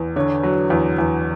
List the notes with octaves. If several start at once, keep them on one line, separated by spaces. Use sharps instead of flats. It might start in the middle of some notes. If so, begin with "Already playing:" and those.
Already playing: E2
D3 C#5
F#3
E2
E2